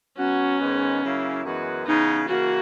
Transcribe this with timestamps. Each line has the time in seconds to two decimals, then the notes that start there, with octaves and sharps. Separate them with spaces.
0.18 F#3 B3 C#4 F#4
0.60 G#2 D#3 G#3 B3
1.03 C#3 F#3 A#3 E4
1.44 F#2 E3 G#3 B3 F#4
1.87 C#3 E3 B3 D#4
2.28 C#3 E3 A#3 F#4